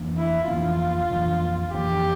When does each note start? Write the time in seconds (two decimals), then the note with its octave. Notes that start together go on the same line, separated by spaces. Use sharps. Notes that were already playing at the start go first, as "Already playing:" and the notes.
Already playing: F2 E3 A#3 D4
0.17 E4
0.48 F2 E3 A#3 D4 F4
1.10 F2 E3 A#3 D4
1.74 F2 E3 A#3 D4 G4